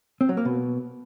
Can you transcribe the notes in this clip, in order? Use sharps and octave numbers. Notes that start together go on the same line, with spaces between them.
C4
F#3
A#3
B2